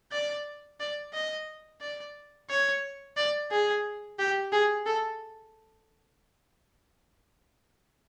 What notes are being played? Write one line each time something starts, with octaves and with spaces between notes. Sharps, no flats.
D5
D5
D#5
D5
C#5
D5
G#4
G4
G#4
A4